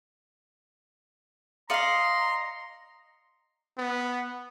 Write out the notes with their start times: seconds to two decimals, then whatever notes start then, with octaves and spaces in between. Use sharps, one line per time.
1.70 D5 D#5 F5 A#5 C6 C7 C#7
3.78 B3